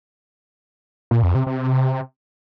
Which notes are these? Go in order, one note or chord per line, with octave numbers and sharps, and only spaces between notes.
A#2
F2
C3
C3